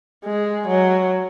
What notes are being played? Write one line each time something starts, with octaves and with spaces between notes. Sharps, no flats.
G#3
F#3